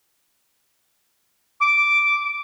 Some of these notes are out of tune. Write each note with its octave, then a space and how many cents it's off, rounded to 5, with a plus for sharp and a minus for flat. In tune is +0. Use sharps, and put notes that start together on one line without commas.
D6 -5